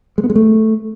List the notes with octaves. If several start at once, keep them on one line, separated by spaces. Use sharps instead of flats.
G#3
B3
G#3
A3